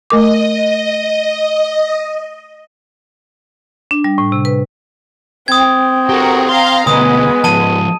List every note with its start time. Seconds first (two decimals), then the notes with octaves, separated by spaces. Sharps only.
0.10 A3 A#4 D#5 D6
3.91 D4
4.04 G3
4.18 A2
4.32 C3
4.45 B4
5.48 C4 D#6 G#6
6.09 F#4 G4 A4 A#4
6.49 F5 A#5 C6
6.87 D2 B2 G#3 B3 D#6
7.44 G#2 F3 A5 D#7